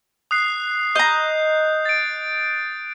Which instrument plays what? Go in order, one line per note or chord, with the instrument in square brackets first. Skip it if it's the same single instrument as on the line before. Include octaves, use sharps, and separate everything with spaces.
[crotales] D#6 F#6 C7
[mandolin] D#5 A#5 [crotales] G6
[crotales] A6 D7